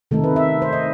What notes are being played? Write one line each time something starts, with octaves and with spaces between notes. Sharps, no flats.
C3 D#3 A3 D#4 A4
B4
E5
C5
D#5